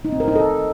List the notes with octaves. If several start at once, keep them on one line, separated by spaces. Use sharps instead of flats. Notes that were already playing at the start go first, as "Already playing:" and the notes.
D#4
C4
A#4
D#4
A4